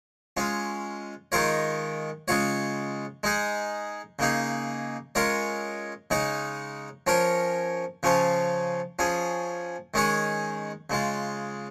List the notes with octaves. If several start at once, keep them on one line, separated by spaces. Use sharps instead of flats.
G#3 C#4 F4
D#3 G#3 F4 A#4 C#5
C#3 G#3 F4 C#5
G#3 D#4 G#4
C#3 A#3 D#4 G#4
G#3 C#4 F4 A#4 C#5
C#3 G#3 D#4 C#5
F3 C#4 A#4 C#5
C#3 F3 C#4 F4
F3 C#4 G#4
D#3 G#3 C#4 G#4 C#5
C#3 G#3 F4